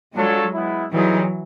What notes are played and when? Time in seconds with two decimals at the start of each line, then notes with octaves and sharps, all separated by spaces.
0.15 F#3 G#3 D4 F4 A4 C#5
0.53 G#3 B3 E4
0.92 E3 F#3 G3 C4 D#4 G#4